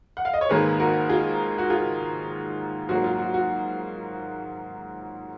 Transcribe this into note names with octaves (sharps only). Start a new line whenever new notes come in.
F#5
F5
D#5
C#5
G#2 D#3 A#3 G#4 B4
F#4 A#4
F4 G#4
F#4
F4 G#4
G#2 F#3 A#3 F#4
F4
F#4
F#4